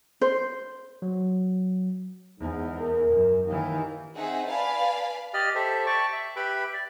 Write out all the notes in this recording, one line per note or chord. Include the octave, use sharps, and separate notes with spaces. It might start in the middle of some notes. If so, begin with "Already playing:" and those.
C5
F#3
E2 G#2
A#4
F#2
D#2 D#3 E3
C4 D#4 G#4 E5 F#5
B4 D5 F5 G#5 A5 B5
G4 D5 D#5 F6
G4 A4 C5 E5
D5 G5 A5 C#6
E5
G4 B4 E5 G5 B5
D5